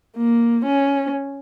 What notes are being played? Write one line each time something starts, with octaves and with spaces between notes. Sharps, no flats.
A#3
C#4